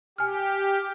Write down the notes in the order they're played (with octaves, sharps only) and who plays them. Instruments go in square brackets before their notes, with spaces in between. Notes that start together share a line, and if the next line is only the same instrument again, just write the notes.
[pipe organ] G4 [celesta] G#5 F6